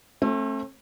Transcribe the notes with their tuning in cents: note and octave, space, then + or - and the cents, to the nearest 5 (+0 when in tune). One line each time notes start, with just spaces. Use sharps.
A3 +0 C4 +45